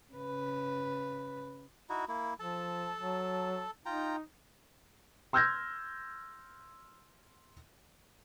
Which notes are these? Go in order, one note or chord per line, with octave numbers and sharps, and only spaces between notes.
C#3 B4
D#4 E4 F#4
A#3 E4
F3 A4 A5
F#3
D#4 F4 G5 A#5
C6 E6 F6 G6 G#6 A#6